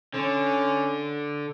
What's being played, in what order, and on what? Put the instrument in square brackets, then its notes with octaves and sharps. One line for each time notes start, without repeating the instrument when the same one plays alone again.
[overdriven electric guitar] D3 [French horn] C#4